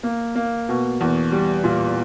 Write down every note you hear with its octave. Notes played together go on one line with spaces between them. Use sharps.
A#3
A#3
B2
E2
G3
A#2